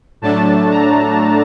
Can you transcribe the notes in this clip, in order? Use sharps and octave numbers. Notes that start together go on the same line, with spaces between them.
A2 F#3 A3 D4 A5
A#5